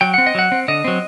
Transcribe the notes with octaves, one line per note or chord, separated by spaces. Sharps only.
F#3 G5
C4 F#5
D#5
F#3 F#5
C4
D3 D#5
F#3 C4